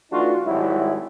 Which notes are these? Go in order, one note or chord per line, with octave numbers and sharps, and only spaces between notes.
E3 A3 D4 D#4 F4 F#4
G#1 F#3 G3 E4